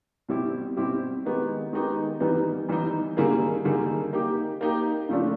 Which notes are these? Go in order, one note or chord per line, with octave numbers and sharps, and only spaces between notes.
B2 G3 C4 E4 G4
B2 G3 C4 E4 G4
D#3 G#3 B3 D#4 G4
D#3 G#3 B3 D#4 G4
E3 G3 B3 D#4
E3 G3 B3 D#4
D3 G3 A#3 D#4 G#4
D3 G3 A#3 D#4 G#4
A#3 D#4 G4
A#3 D#4 G4
C#3 F3 A3 D4